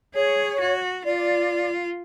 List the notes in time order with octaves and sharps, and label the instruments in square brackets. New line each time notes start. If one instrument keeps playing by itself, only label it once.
[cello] G#4 [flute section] C#5
[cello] F#4
[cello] F4 [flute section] D5